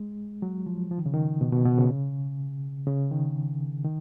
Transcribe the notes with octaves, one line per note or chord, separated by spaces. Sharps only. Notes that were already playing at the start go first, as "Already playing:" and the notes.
Already playing: G#3
F#3
F3
F3
D#3
C#3
D#3
B2
B2
B2
C#3
C#3
D#3
D#3